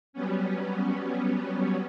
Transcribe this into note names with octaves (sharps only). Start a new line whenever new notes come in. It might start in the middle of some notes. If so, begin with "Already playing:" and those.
F#3 G3 B3 C#4